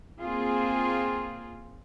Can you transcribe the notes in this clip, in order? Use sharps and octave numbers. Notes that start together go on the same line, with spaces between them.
A#3 C4 F4 G#4